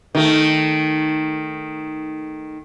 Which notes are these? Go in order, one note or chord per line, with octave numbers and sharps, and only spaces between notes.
D#3 A3